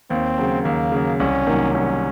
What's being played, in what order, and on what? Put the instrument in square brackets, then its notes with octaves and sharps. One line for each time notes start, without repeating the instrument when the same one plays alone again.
[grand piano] D#2 [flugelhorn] C4
[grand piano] C#3 F#3
[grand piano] D#2 [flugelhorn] A#3
[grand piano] C#3 F#3
[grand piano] C2 [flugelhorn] C#4
[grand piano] C3 D#3 F#3 A#3
[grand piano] C2 [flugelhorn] C#4